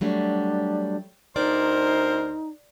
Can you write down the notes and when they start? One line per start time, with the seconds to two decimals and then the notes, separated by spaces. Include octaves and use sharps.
0.01 F#3 G3 A3 D4
1.36 D2 D#4 A#4 C5 D5